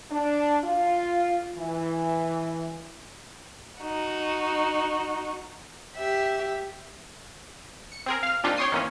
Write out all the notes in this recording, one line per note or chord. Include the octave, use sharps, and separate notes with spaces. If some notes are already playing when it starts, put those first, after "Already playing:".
D4
F4
E3
D#4 F#4
G4 E5
C#7
C4 G#4 A#4
F5 F6
A#2 G3 C4 D4 D#4 F4
C#5 G5 C6 C#6 D#6 C7
G#2 D#3 E3 A#3 C4 C#4